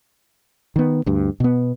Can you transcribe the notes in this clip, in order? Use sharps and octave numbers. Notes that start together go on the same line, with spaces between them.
D#3 B3
D2 G2
B2 B3